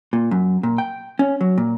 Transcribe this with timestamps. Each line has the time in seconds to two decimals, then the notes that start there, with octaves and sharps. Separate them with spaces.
0.13 A#2
0.31 F#2
0.63 A#2
0.78 G5
1.19 C#4
1.41 F#3
1.58 A#2